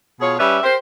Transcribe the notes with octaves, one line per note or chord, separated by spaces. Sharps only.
B2 F4 G#4 C#5
G3 C#4 B4 D5 E5
G4 A#4 C5